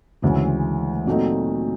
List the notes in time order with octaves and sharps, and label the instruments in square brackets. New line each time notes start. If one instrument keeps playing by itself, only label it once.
[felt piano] D2 C#3 E3 G#3
A#2 F#3 A3 C4 D#4